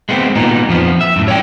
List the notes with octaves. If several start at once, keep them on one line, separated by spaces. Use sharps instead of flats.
G#3 A3 B3 C4
A#2 B3 D#4
F2 F3 B3
E5
F#2 A2
C#5 D5 F#5 G5